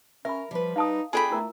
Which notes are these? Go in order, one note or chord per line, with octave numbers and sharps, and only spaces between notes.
C#4 A#4 E5 B5
F3 G3 B4
D#4 F5 A5 D#6
B3 D4 F4 G#4 A4 G5 G#5 B5
A3 E4 A#4 A#5